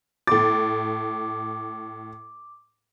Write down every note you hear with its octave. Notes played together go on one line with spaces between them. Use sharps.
A2 D6 A6